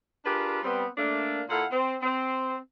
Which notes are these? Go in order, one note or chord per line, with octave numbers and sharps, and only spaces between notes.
D4 F4 G4 G#4 A#4 B4
G3 B3 C4
A3 A#3 D4
A#2 E4 A4 F5 F#5
C4
C4